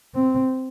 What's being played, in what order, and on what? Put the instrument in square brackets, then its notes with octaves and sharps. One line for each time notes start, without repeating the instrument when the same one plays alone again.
[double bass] C4